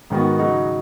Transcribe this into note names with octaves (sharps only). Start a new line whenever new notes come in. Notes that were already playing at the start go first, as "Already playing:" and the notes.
G#2 D#3 B3 F#4
C#3 F#3 D#4 F#4